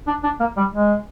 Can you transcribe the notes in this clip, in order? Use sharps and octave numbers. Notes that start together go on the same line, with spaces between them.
D4
D4
A#3
G3
G#3